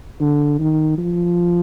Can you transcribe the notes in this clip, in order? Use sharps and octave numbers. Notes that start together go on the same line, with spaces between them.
D3
D#3
F3